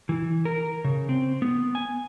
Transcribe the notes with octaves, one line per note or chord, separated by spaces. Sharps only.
E3
A#4
C#3
C4
B3
G#5